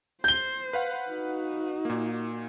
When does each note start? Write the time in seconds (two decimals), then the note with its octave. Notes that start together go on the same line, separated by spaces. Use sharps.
0.24 C5 G6 G7
0.73 B4 F5 F#5
1.10 D#4 F#4
1.85 A#2 A#3